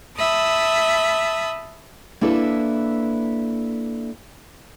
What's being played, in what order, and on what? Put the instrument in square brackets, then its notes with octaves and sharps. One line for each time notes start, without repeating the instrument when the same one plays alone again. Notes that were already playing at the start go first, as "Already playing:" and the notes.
[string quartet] E5 A5 B5 D#6
[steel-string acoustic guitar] A#3 D4 E4 A4 B4